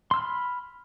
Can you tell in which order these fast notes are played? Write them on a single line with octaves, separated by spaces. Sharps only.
C6 E6 F6 B5